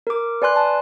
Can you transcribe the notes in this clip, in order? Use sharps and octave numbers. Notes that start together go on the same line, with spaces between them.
A#4 D6
B4 D5 G#5 C6 F#6
A5